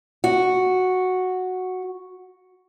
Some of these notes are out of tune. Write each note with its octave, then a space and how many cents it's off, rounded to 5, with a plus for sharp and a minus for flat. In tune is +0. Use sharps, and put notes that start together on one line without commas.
F#4 -5